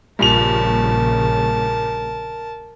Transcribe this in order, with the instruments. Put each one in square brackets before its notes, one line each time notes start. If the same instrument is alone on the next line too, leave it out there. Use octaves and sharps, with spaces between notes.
[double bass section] A#1 C#3 [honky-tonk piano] G2 A#2 F7 [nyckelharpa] A#4 A5